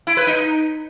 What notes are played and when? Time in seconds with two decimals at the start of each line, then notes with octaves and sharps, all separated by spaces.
0.07 E4
0.17 B4
0.27 D#4